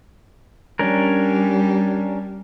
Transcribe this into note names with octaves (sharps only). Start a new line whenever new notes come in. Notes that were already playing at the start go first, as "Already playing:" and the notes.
G3 C#4 D4 A#4